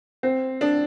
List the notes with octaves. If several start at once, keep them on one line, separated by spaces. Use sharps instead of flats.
C4
D4